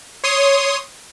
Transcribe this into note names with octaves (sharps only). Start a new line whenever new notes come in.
C#5 C6 D#6